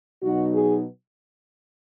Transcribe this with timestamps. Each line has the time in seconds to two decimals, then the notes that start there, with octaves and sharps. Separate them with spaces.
0.23 B2 F#3 D#4 F#4
0.54 G#4